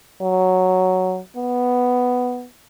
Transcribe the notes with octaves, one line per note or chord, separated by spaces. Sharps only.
F#3
B3